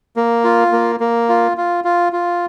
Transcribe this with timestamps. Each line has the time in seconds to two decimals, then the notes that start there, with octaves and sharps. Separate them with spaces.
0.16 A#3
0.44 F4
0.72 A#3
1.00 A#3
1.29 F4
1.57 F4
1.84 F4
2.13 F4